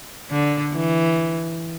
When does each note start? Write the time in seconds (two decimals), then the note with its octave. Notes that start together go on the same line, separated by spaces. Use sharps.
0.30 D3
0.73 E3